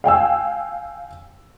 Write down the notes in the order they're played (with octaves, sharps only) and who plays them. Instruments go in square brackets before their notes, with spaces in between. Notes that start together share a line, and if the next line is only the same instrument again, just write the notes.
[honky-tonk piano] F5 G5 G#5 E6